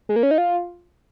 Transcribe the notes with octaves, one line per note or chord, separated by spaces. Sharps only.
G#3
A#3
C#4
D#4
F4